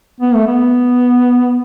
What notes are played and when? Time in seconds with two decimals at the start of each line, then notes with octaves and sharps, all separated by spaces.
0.21 B3
0.34 A3
0.47 B3